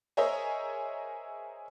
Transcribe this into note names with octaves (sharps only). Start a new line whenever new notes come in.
G#4 A#4 C5 C#5 D#5 E5